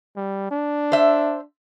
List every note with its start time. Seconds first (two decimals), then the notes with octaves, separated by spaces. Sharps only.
0.16 G3
0.51 D4
0.92 C5 E5